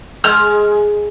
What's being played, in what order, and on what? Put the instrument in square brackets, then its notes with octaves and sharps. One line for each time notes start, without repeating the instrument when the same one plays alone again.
[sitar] G#3 [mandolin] F6